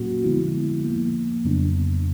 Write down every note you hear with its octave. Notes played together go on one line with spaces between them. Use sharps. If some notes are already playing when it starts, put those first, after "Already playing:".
Already playing: A#2 F#3 A#3 C#4 F#4
D3 F3 G#3 B3 E4
A#2 F3 A#3
F2 C#3 F#3 B3 D4